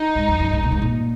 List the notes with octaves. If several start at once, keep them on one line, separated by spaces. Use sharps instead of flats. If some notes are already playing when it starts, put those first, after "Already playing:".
Already playing: D#4
G#2
F2
F#2
G#2
A#2
G#2
A#2